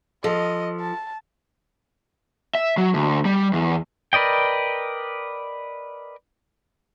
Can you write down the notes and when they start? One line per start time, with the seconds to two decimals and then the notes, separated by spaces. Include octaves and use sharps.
0.24 F3 A4 D#5
0.80 A5
2.55 E5
2.77 F#3
2.94 D2
3.25 G3
3.53 E2
4.13 A#4 B4 D5 D#5 G5